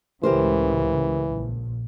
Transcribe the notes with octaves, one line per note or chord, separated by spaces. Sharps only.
C#2 A2 C#3 E3 G4 A#4 C5
A#1 A#2